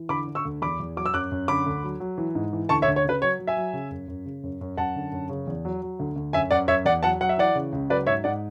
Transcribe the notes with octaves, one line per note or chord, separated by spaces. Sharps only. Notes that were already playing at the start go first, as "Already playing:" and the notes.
Already playing: E3
D3 B5 D6
D3
C#6 E6
D2
E2 B5 D6
E2
F#3 D6
E6
F#2 D6 F#6
F#2
D3 B5 D6
D2
F#3
F#3
E3
G#2
E3
D2 A5 C#6
C#5 E5
D2
C#5
C#3 B4
F#3 C#5
F#3
E5 G#5
F#3
C#3
F#2
F#2
C#3
F#2
F#2
F#2 F#5 A5
D3
F#2
C#3
E2
F#3
F#3
D2
D2
F#2 E5 G#5
F#2 D5 F#5
F#2 C#5 E5
E2 D5 F#5
F#3 F#5 A5
F#3 F#5
E5
E3 D5 F#5
C#3
C#2
F#3 B4 D5
G#2 C#5 E5
G#2 D5 F#5